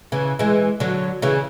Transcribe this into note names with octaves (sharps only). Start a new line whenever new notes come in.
C#3 E3
E3 G#3
D3 F#3
C#3 E3